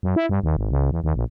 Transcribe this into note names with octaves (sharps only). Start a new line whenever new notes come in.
F#2
E4
G2
D#2
G#1
C#2
E2
D#2
A#1